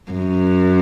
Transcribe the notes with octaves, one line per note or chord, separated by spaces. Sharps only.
F#2